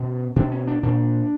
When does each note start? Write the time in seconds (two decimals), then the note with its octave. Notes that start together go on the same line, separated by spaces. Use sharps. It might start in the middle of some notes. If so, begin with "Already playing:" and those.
Already playing: B2 C#4
0.36 B2 D4
0.51 C#4
0.67 D4
0.83 A#2 D4